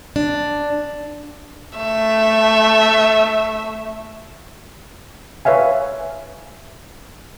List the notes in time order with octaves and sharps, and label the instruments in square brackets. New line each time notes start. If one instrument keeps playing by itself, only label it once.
[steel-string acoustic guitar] D4
[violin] A3 E5
[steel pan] B4 C#5 E5 F5 G#5